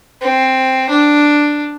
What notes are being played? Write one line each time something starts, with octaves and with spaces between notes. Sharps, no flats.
C4
D4